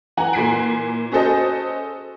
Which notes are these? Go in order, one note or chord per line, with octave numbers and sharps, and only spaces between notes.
E3 F#5 G#5 A#5
A#2 E3 G#5 B6 C7 D7
C#4 F#4 G#4 A4 C5 D#5